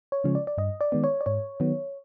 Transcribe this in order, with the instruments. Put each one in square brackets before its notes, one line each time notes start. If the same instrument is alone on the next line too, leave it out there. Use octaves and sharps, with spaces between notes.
[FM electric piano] C#5
C#3 F3 G#3 C#4
D5
D5
G2 D#5
D5
D#3 G#3 B3
C#5
D5
G#2 C#5
D#3 F#3 B3